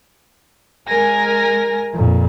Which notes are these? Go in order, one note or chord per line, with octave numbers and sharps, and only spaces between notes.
G#3 A#4 G#5 A#6
F2 A#2